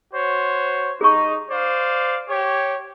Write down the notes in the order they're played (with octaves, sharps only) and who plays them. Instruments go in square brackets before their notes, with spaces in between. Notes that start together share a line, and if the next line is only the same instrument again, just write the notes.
[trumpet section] F#4 C5 C#5
[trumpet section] D#4 [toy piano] G#4 C#6
[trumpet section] C5 D5 F5
G4 C#5